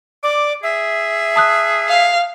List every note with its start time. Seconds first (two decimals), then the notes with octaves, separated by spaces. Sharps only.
0.23 D5 D6
0.63 G#4 E5
1.36 A5 D#6 F#6
1.88 F5